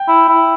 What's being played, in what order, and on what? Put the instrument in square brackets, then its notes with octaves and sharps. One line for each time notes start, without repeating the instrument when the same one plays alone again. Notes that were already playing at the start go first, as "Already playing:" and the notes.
Already playing: [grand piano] G5
[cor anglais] E4
E4